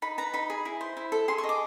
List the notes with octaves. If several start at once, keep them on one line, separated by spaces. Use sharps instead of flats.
D#4 B5
B4 A#5
D#4 B5
G#4
E4
C5
E4
A4
G#4 C6
C#6
D#5
D6